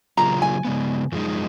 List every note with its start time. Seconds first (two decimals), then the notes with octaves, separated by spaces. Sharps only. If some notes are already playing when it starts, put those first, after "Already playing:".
0.17 C#3 F#3 A#3 F4 G#4 A#5
0.42 G#5
0.65 C#3 G#3 B3
1.12 F#2 F3 G#3 D#4